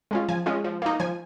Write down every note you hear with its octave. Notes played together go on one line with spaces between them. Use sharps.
G#3 C#4 F4
F3 G#5
G#3 C#4 F4
F3
A#3 D#4
F3 G#5